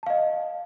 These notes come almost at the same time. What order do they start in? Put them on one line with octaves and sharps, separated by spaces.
A5 F5 D#5